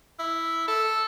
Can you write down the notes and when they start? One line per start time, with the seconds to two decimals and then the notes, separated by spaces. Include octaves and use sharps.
0.19 E4
0.68 A4